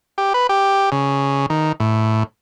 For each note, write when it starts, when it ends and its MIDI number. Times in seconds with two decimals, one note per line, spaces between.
0.18 0.33 67
0.34 0.47 71
0.49 0.90 67
0.92 1.46 49
1.50 1.72 51
1.80 2.23 45